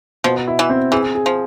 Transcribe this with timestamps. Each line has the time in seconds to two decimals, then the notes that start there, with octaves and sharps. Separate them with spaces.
0.24 B2 F3
0.47 E4
0.59 E3
0.70 C4
0.92 E3 G#4
1.15 G#4
1.26 F3